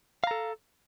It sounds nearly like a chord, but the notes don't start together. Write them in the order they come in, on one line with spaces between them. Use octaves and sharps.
F5 A#5 A4